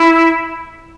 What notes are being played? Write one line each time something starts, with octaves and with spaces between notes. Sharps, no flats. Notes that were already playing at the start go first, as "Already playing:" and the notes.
Already playing: E4